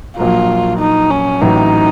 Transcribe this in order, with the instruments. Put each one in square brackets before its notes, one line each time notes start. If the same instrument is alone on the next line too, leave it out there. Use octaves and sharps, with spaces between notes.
[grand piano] A#1 A#2 F#3 A#3 [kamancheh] F4
[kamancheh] D#4
C#4
[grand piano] A1 A2 F#3 [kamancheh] D#4